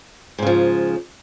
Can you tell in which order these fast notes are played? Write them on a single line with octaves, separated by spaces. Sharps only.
G#2 C#3 F3